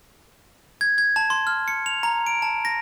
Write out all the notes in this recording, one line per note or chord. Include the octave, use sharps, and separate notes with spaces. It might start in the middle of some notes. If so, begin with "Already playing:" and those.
G#6
G#6
A5
C6
F6
C#7
F7
A#5
D7
A5
A#6